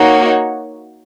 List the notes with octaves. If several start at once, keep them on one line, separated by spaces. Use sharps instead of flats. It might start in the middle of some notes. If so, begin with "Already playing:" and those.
Already playing: A#3 D#4 F#4 C#5